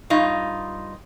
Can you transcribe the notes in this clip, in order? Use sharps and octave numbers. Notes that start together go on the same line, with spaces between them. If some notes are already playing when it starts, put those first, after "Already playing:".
G2 D#4 F4